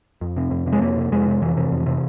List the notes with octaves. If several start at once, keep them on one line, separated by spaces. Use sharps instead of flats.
F2
C3
F2
C3
G#3
F2 A#3
C3
F2 G#3
C3
F2 E3
C3
F2
C3